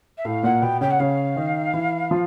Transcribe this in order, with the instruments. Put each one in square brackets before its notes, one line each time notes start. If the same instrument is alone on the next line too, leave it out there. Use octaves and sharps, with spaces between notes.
[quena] E5
[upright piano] A2 A3 [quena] F5
[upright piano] A#2 A#3 [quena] F#5
[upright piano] B2 B3 [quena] G5
[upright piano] C#3 C#4 [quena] G5
[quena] F#5
[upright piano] C#3 C#4 [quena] F5
[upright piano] D#3 D#4
E3 E4
F3 F4